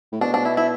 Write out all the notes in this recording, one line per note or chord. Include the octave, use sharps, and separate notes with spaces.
A2
B2 D4
D4
E4
E4